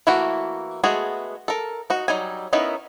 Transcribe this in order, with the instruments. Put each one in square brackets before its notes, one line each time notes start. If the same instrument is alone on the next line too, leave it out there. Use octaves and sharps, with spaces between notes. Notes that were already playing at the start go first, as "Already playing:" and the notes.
[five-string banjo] E3 A3 A#3 E4 F#4
G#3 A3 B3 F#4 G#4
A4 A#4
D#4 F#4
F#3 G3 D#4 G#5
B3 C#4 D#4 E4 A#4